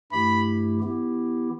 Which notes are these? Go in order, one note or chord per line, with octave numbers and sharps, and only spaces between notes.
G2 E3 A3 E4 G4 B5
E3 B3 E4 G4